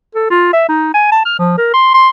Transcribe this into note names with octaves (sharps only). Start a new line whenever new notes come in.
A4
F4
E5
D#4
G#5
A5
F6
F3
A#4
C6
C6